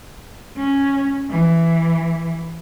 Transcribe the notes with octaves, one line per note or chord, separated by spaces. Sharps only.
C#4
E3